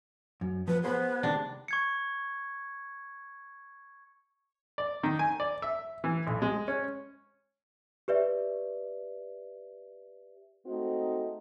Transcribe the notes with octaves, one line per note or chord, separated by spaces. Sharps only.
F#2
F3 B4
B3 G#4 C5 B5
C3 D#3 G#3 D4
C#6 G#6 C#7
D5
D#3
G#5
D5
E5
E3
B1
G#3
C#4
G4 B4 D5 E5
G#3 A3 C4 D#4 F#4